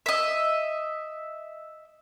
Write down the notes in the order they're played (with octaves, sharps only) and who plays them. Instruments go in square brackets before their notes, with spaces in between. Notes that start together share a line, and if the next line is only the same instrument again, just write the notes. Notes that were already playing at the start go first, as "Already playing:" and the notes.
[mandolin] D#5 E5